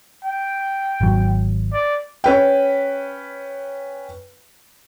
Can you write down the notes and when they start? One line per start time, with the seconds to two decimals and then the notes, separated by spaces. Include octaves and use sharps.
0.24 G5
1.01 G#1 F#3
1.73 D5
2.24 C#4 B4 G5